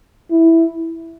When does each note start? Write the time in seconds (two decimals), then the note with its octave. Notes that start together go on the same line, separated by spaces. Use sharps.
0.31 E4